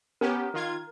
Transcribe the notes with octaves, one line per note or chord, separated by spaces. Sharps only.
B3 C#4 G4 A#4
D#3 F4 G#6